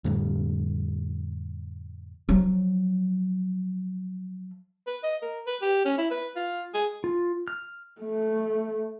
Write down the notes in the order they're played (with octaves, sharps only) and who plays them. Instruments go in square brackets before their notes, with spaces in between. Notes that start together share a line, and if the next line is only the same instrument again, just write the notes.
[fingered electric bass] F2 A2 D3 G3
[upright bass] F3 F#3
[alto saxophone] B4
D#5
A#4
B4
G4
C#4
E4
B4
F4
G#4
[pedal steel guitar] F4
F6
[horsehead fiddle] A3